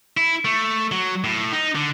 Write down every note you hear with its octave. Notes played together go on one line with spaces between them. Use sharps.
E4
A3
F#3
A2
D#4
D3